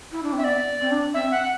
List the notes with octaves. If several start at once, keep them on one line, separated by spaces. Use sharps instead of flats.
E4
D4
C4 E5
B3 D5
C4
D4
C4 E5
F#5